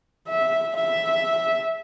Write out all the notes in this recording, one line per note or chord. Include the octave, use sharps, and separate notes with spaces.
E5
E5